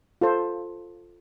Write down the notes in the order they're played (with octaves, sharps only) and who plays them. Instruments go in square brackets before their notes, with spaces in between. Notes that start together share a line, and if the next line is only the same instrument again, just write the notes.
[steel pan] F4 A4 C5